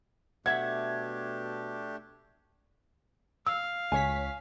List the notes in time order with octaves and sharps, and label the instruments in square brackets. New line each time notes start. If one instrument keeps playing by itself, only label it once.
[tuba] B2 [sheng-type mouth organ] A3 D4 G4 [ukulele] E5 F#5 [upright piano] G#6
[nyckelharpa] F5 [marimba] E6
[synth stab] C#2 C#5 B6 [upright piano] G#5